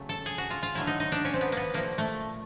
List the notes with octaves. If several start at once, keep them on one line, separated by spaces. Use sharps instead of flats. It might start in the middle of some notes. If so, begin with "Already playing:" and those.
Already playing: C#3 F#3 A3
A4
G#4
F#4
F4
F4
D3 F#3 A3 E4
D#4
D#4
D4
C#4
C4
B3
A#3 B3
A#2 F3 A3 A#3
A3